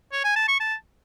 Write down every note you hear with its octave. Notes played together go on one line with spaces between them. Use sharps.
C#5
G#5
A5
C#6
A5